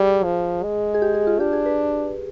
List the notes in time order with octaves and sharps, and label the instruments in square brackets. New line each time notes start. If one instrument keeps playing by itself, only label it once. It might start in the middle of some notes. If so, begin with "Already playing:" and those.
Already playing: [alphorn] G3 [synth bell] G#4
[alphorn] F3
G#3
[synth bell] G#4
G4
G#4
F4
[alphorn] D4 [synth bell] G4
[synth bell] G#4
B4